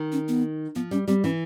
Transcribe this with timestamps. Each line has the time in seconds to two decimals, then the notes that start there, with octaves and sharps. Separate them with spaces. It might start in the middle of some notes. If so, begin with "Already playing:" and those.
Already playing: D#3
0.12 C#4
0.28 B3
0.75 F3 B3
0.91 G3 C#4
1.08 G3 C4
1.24 E3 C#4